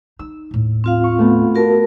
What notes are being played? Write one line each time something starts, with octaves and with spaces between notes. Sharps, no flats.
D#4 E6
D#2 A2
C4 F4 F5
C#6
A3 B3
F#4 A#4 A5